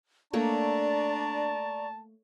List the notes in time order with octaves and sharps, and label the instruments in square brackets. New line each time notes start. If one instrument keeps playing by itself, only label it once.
[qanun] A3 A#3 C#5 [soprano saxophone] D4 [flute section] D5 A#5 C#6 [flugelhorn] A5